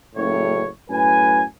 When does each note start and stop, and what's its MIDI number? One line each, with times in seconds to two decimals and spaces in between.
0.15 0.66 30
0.15 0.66 45
0.15 0.66 73
0.90 1.42 42
0.90 1.42 45
0.90 1.42 71
0.90 1.42 80